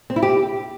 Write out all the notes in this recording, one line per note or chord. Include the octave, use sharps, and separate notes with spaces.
C4
E4
G4